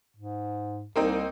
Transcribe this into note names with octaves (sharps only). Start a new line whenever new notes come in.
G#2
C2 A#3 C4 D#4